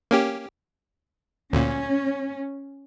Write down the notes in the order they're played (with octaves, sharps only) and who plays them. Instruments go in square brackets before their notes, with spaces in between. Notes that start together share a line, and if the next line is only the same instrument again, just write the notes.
[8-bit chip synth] A#3 C#4 G4
[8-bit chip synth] D2 A#2 [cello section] C#4